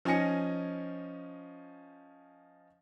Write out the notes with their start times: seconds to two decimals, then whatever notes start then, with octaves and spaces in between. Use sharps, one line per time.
0.05 F3 C#4 D#4 G#5 A#6 C#7